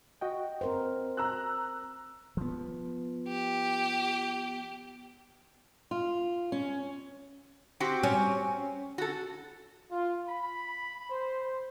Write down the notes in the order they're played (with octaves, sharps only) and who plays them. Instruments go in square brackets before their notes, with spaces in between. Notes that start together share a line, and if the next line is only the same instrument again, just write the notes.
[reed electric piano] F#4 D#5 G5
[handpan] C4 A#4 C5
[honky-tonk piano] A#5 E6 F#6
[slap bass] F3 B3
[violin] G4
[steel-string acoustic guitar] F4
C#4
[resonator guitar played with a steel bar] C4 F#4 G4
[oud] C#4
[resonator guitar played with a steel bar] F#4 A4
[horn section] F4
B5
C5